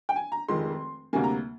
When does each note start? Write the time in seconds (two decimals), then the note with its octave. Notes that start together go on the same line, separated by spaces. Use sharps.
0.09 G5
0.16 G#5
0.32 A#5
0.48 F1 F2 D#3 G#3 C6
1.13 D2 C3 G3 A#3 G#5
1.24 A#5